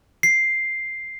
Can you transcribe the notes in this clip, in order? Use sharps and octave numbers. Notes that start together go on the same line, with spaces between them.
C7